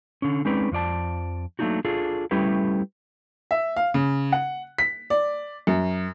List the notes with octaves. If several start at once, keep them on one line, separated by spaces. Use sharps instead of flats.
D3 C#4
G#3 C4 C#4 D#4 B4 D5
F2 F3 D5 A5
F#3 A3 A#3 D4 D#4 F#4
D4 F4 G#4 A4
G3 A3 C#4 E4 G4 B4
E5
F5
C#3
F#5
B6
D5
F#2